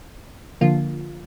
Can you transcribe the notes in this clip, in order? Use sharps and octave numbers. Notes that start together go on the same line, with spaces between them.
D3 F3 A#3 F4